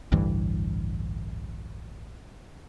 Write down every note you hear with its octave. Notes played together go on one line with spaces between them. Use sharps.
A1 D2 G2 E3